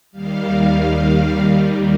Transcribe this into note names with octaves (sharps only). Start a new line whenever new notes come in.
D#2 D#3 G3 F5